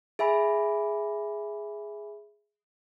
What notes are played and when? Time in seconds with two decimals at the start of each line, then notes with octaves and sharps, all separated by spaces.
0.19 G#4 E5 G#5 B5